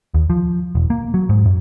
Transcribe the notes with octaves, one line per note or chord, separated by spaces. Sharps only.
D#2
F3
E1
A#3
F#3
G#2
F#2